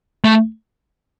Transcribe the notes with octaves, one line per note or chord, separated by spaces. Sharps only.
A3